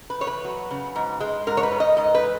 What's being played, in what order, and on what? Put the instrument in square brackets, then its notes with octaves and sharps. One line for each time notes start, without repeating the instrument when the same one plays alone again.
[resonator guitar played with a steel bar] B4
E2 C#5
B4
F#3
C#3
G#2
G#3
G#2 A#4
C#5
B4
G#2
D#5
G#2 D#5
B4
E3